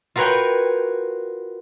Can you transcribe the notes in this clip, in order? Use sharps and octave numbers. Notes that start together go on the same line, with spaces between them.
F4 F#4 A#4 B4 C#5 G5